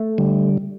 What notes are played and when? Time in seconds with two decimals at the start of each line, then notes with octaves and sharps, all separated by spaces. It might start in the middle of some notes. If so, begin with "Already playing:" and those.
Already playing: A3
0.18 D3 G3